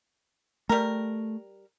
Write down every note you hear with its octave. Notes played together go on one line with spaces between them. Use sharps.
G3 A3 A#4